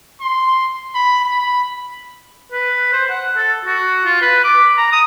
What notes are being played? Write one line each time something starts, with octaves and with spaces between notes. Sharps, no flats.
C6
B5
B5
B4
C5
F#5
A4
F#4
F4
B4
D6
A#5
D#6